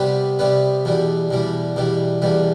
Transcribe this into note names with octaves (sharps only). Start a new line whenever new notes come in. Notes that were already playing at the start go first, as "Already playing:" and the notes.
Already playing: C3 G3 B3
C3 G3 B3
E2 B2 G3
E2 B2 G3
E2 B2 G3
E2 B2 G3